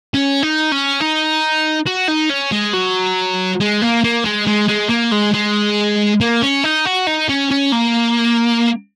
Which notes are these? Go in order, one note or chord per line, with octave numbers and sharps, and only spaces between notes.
C#4
D#4
C#4
D#4
F#4
D#4
C#4
G#3
F#3
G#3
A#3
A#3
G#3
G#3
G#3
A#3
G#3
G#3
A#3
C#4
D#4
F#4
D#4
C#4
C#4
A#3